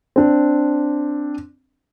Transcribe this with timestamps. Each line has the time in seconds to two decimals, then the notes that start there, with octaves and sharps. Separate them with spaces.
0.16 C4 D4